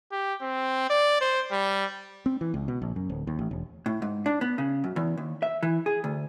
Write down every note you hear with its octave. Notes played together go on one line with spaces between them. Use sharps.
G4
C4
D5
C5
G3
C4
E3
C#2
B2
A#1
F#2
D1
D#2
A1
E1
A2
G#2
D4
B3
C#3
F#2
E2
D#2
E5
E3
G#4
D2